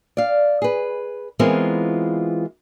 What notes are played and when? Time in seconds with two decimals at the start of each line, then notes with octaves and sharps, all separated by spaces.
0.17 D5 F5
0.62 G#4 B4
1.39 E3 G#3 B3 C4 F4 A#4